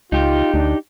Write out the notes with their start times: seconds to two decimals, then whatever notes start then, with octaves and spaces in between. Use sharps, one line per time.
0.12 C#2 D#4 F4 G4
0.54 D2 D4